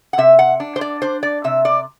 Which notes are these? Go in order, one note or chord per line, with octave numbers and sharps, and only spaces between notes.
F#5
C3 E5
F#5
D4
C5
D5
D4 C5
D5
C3 E5
D5